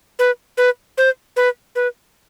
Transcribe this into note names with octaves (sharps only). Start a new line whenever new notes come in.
B4
B4
C5
B4
B4